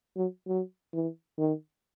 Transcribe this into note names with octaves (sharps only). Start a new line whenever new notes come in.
F#3
F#3
E3
D#3